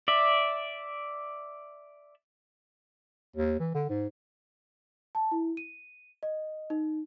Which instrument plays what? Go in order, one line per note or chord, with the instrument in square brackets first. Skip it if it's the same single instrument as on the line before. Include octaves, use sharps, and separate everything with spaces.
[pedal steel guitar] D5 E5
[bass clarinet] D#2
E3
D3
G#2
[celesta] A5
E4
D#7
D#5
D#4